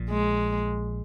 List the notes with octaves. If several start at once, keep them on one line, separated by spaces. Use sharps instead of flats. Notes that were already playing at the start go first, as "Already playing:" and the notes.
Already playing: A#1 A#2
G#3